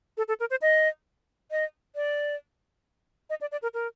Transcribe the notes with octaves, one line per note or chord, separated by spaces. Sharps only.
A4
A4
A#4
C5
D#5
D#5
D5
D#5
D5
D5
A#4
A#4